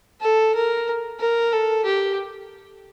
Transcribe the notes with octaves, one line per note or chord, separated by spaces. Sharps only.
A4
A#4
A#4
A4
G4